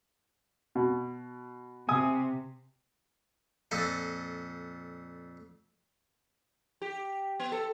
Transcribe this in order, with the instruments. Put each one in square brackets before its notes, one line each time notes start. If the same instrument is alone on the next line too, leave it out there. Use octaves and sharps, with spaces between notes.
[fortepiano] B2
[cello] C3 [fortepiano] G#5 D#6
[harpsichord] F2 A#2 A4 D#5
[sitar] G4
B3
A4